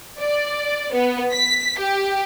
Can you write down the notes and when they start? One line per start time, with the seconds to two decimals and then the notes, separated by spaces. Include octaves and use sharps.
0.19 D5
0.93 B3
1.32 B6
1.79 G4